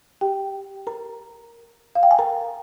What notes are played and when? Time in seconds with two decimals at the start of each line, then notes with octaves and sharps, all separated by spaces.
0.21 G4 G5
0.87 A#4 A#5
1.95 F5
2.03 G5
2.11 G#5
2.19 A#4 A#5